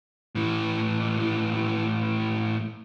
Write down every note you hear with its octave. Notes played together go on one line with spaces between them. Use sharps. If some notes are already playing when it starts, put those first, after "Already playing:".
A2 E3